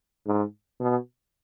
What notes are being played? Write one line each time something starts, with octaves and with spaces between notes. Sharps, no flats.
G#2
B2